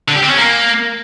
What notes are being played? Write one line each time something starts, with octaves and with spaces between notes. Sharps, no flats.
D3
G4
C4
C#4
A#3